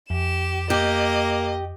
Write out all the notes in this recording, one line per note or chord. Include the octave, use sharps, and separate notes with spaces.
F2 G4 E7
A#3 G4 D#5